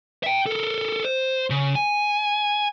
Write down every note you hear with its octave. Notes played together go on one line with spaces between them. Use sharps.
E5 G5
A4 A#4
C5
C#3
G#5